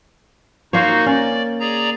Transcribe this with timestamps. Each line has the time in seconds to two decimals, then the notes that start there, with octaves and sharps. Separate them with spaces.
0.73 A#3 D#4 F#4 C5 C#5
1.06 C#4 D5
1.60 G#4 D5 A#5